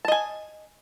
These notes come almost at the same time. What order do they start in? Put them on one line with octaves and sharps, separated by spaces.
A5 D#5 G#5